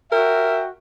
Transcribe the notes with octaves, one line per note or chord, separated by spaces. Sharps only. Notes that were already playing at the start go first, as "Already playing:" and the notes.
F#4 A#4 E5 G5